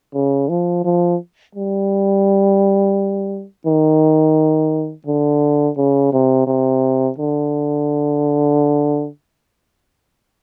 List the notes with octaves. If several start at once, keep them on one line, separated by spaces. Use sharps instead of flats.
C#3
F3
F3
G3
D#3
D3
C#3
C3
C3
D3